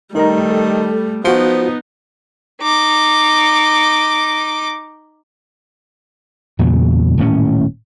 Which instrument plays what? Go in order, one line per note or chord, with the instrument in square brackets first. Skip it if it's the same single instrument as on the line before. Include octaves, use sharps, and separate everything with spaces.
[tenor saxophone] D#3 [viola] G3 A3 [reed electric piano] D#4 A#4 A#5
[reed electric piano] A4
[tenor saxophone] F3 [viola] B3 D#4 [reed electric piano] F4 F#4
[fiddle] D#4 D6
[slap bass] E2 A#2 C#3 F#3
D#1 A2 B3 C#4